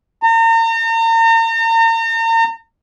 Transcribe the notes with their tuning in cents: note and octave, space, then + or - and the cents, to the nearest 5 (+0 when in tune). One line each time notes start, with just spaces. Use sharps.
A#5 -40